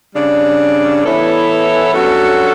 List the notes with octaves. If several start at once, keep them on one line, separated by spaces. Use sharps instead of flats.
C#3 G3 D4
E3 B3 E4 A4 C#5
G2 F#3 C#4 F#4 A4